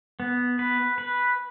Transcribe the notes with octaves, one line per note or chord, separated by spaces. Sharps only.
B3
B4
B4